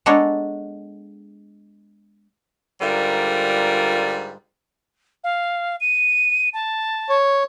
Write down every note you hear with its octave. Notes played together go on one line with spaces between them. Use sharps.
G#3 B3 D4 A4 C#5 A#5
G#2 D3 G3 F4 A#4
F5
D#7
A5
C#5